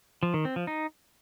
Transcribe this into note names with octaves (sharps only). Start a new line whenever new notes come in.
F3
D#3
C4
F3
D#4